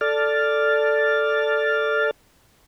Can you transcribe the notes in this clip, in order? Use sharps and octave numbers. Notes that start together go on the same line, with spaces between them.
A4 D5 F6 A6